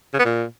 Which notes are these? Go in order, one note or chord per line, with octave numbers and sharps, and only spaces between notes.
C#3
B3
A#2